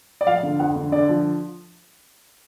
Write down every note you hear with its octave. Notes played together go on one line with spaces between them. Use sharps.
D5
F3 F5
D3
F2 F#5
D3
D3 D5
F3